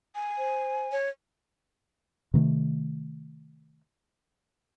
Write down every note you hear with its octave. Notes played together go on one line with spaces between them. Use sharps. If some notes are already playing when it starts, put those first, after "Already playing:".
G#5
C5
C#5
C3 D#3 A3